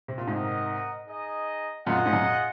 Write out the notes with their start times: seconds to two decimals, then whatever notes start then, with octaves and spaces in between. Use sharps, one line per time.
0.08 C3
0.18 A#2
0.27 G#2 C3 D#4 A#4 D#5 F#5
1.07 D#4 G#4 D#5
1.86 F#2 A#2 F4 G#4 D#5 F#5
1.99 A#2
2.06 G#2
2.13 F#2